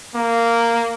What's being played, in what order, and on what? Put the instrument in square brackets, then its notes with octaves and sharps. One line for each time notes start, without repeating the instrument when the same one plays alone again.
[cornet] A#3